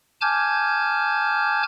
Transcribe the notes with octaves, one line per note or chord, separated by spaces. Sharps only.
G#5 A5 D6 F6 G6 G#6